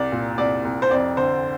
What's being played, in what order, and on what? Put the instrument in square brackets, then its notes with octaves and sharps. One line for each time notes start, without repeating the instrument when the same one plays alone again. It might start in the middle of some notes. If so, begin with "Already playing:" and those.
Already playing: [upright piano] C2 D5
A#2
C2 D5
C2
C5
F2 D5
D3 C5